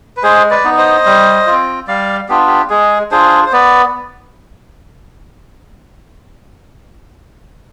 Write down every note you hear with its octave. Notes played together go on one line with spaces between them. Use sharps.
B4
G#3 G#4 C5
B4 D5
B3 D#4
C5 D#5
G3
F4
C4
G3 D5 F5
B3 D4 F4 G4
G4
G#3 G#4
D4 F4 G#4 C5
C5
B3 B4 D5